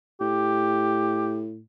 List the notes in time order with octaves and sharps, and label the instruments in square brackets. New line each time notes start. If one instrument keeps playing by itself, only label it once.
[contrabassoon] A2 [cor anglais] G4